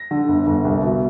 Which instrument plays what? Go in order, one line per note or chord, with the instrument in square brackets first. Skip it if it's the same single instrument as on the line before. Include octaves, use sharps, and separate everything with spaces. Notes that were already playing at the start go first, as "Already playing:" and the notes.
Already playing: [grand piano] A#6
D3
G1
G1
C2
B2